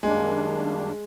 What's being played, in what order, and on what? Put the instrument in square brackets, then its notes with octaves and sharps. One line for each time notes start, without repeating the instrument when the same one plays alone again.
[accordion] F#2 D#3 G3 A#3 D4 [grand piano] G#3